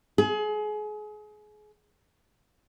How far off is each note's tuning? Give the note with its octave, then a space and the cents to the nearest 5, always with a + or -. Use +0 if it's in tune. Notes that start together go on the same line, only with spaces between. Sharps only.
G#4 +30